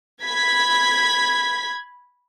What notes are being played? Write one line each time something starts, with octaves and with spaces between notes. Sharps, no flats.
B5 G#6 B6